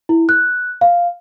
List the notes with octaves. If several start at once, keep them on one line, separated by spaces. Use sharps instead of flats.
E4
F#6
F5